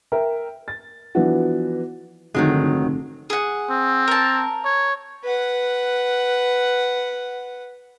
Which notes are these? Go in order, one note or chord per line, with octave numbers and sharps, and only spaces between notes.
A#4 E5 G5
A6
E3 F3 B3 D4 E4 F#4
F1 G2 D3 D#3 F#3 G#3
G#4 F#5
C4
A#4 A5
C#5
B4 F#5